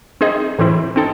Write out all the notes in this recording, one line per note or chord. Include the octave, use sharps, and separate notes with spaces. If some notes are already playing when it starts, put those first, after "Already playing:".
C4 D#4 G#4 D#5
A2 E3 C4 E4
C4 D#4 A4